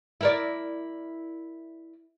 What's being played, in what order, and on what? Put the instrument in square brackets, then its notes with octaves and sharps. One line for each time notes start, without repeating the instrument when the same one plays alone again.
[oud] E4 A#4 D5